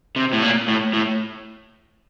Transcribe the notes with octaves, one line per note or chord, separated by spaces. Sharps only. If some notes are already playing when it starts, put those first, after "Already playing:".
C3
A2
A#2
A2
A2